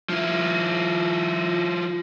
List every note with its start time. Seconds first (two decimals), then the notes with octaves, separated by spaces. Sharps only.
0.09 F3 E4